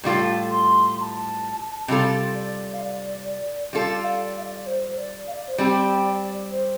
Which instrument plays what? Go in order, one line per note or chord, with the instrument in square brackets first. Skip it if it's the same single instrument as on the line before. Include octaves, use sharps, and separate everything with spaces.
[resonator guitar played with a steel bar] A2 G3 F4 A4
[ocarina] C6
C6
A5
[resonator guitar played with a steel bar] C3 G3 F4 A4
[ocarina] D5
F5
D5
[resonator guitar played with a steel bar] G3 F4 A4 [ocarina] F5
[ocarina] D5
F5
D5
C5
D5
F5
D5
C5
[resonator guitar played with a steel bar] G3 C4 G4 [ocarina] D5
[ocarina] C5